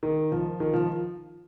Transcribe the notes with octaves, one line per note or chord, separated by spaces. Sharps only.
D#3
F3
D#3
F3